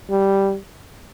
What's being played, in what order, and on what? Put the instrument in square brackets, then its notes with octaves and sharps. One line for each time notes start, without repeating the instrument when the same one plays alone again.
[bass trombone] G3